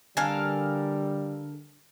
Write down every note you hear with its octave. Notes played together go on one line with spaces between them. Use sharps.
D3 G3 A4 A#4 F5 G#5 F#6